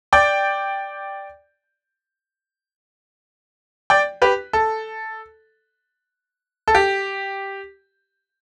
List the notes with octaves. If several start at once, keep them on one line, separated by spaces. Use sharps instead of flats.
D5 G5
D5 G5
G4 B4
A4
A4
G4